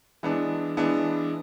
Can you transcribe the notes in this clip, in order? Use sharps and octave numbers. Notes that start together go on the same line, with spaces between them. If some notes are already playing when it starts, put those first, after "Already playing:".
E3 G#3 B3 D4
E3 G#3 B3 D4